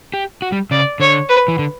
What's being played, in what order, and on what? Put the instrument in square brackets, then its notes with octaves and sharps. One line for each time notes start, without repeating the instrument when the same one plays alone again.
[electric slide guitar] G4
F#4
G3
[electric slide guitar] C#3 [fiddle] D5
[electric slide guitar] D3 [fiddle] C#5
[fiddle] B4
[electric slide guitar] E3
D3